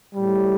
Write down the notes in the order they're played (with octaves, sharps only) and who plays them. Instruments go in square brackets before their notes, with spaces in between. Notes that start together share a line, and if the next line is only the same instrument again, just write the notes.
[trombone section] A2 G3